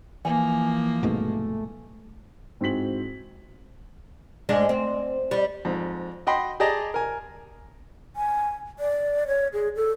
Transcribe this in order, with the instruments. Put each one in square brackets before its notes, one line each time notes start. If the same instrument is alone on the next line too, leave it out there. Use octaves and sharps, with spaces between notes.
[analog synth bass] E3 [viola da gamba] F3 A#3 [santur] G#5
[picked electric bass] C2 G#2 B2 [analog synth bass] A3
[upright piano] G#2 C4 E4 F#4 B6 F#7
[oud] G#2 G#3 D4
C4
G3
[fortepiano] F2 G#2
F#4 D#5 G5 B5 C6
G4 G#4 D5 D#5 A5 A#5
A#4 G#5
[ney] G#5
D5
C#5
G#4
A4